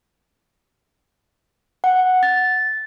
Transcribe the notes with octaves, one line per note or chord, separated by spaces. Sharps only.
F#5
A6